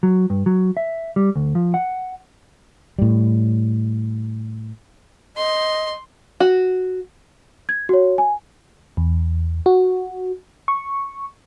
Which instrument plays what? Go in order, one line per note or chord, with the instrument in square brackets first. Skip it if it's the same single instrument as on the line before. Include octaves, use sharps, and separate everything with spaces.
[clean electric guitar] F#3
G2
F#3
E5
G3
D2
F3
F#5
[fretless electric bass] A2 G3
[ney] D#5 [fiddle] C6
[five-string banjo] F#4
[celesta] G#6
F#4 C#5
G#5
[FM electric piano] E2
F#4
C#6